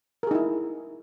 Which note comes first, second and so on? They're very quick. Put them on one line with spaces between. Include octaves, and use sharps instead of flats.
A#4 G#4 D#4 E4